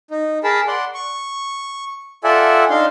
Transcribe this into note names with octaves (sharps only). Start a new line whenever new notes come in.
D#4
G#4 A#4 A5 B5
D5 F#5 C6
C#6
F4 A4 D5 E5 F#5 G#5
D4 D#4 F5 C6